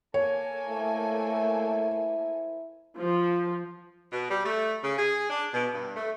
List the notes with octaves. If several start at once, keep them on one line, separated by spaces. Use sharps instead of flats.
A#3 A4 C#5 G#5
A3 E4 C5 E5
F3
B2
G3
A3
C#3
G#4
D4
B2
G2
A3